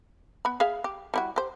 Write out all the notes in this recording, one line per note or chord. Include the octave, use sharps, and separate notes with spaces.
B3 B5
G#4 E5 F5
G4
G3 E4 F#4
G4 C5